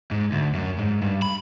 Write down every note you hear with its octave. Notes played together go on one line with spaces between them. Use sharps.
G#2
D2
F#2
G#2
G2
B5